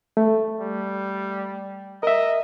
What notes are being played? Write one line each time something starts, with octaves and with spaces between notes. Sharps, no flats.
A3
G3
A#4 D#5 E5